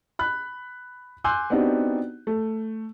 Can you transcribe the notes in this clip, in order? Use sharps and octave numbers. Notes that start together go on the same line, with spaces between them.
B5 F#6
G#5 C6 D6 E6 F#6 G6
B3 C4 D4 D#4 F#4 G4
A3